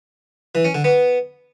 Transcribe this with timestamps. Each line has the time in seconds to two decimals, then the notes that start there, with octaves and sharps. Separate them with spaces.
0.55 E3
0.65 C#4
0.75 D3
0.84 B3